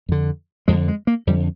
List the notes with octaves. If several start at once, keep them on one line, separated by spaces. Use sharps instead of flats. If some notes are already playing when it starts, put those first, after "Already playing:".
F2 D3
F2 D3 G#3
G#3
A#3
F2 D3 G3